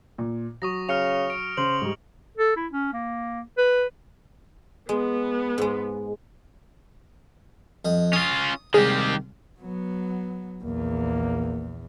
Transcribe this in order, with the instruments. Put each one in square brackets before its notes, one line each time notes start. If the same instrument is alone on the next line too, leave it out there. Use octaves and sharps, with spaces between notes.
[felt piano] A#2
[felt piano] F#3 [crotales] C#6 D#6 A#6
[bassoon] C#3 [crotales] F6 C#7 F7
[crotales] D7
[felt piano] C#3 [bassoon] C5 [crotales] F#7
[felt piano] G#2 G3
[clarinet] A4
E4
C#4
A#3
B4
[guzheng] G#3 [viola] B3
[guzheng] G#2 G#3
[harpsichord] F2 D#5
[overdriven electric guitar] C#4 F4 [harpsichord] D#6
[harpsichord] C2 G#3 [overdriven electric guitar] D#3 G4 [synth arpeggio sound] G#4
[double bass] F#3 B3
[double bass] A#1 E2 [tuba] A#3